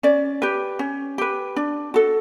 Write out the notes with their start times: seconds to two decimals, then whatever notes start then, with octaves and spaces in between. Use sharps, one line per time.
0.03 C#4 D5
0.42 G4 B4
0.79 C#4
1.18 G4 B4
1.56 D4
1.94 F#4 A4